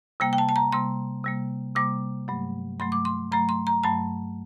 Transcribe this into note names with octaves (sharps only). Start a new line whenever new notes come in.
C3 G3 A#3 G5
G5
A5
A5
A#5
C3 G3 A#3 C6
C3 G3 A#3
C3 G3 A#3 D6
G2 F#3 A3
G2 F#3 A3 C6
D6
C6
G2 F#3 A3 A#5
C6
A#5
G2 F#3 A3 A5